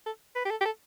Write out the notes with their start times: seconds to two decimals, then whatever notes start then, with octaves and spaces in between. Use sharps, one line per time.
0.06 A4
0.36 B4
0.45 G4
0.51 A4
0.61 G4
0.65 A4